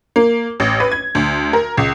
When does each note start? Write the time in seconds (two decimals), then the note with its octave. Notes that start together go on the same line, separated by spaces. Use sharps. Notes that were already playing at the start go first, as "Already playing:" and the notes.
0.16 A#3
0.60 A1
0.80 B4
0.92 G#6
1.15 D2
1.53 A#4
1.77 C#2